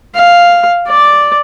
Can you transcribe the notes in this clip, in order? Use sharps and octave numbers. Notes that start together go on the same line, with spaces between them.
F5
D5